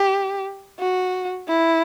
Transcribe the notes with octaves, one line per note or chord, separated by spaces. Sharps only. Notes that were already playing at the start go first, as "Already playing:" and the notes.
Already playing: G4
F#4
E4